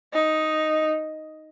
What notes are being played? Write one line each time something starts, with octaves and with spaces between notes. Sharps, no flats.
D#4